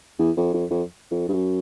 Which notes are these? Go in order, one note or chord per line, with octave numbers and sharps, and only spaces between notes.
E2
F2
F2
F2
F2
G2
F#2